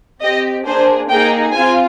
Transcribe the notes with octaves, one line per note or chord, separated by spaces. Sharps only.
C4 G4 D#5
A#3 D4 G#4 C5
A#3 D#4 G#4 G5
C4 F4 G#5